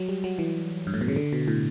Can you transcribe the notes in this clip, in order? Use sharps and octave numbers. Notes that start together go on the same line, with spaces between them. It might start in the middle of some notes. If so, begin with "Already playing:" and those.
Already playing: F#3
G3
F#3
E3
G2
A2
B2
C#3
D3
B2
A2